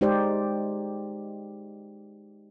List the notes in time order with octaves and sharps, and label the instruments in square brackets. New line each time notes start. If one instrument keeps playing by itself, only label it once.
[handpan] G#3 D#4 G4 C5 D5